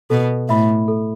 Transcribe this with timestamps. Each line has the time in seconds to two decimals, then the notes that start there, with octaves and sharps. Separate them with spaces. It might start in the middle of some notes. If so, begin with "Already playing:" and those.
0.10 B2 A4
0.49 A2 E5 B5
0.88 A4